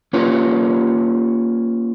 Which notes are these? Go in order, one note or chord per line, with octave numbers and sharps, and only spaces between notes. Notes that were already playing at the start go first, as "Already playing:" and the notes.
A#3 C#4 F4 G4 B4 C#5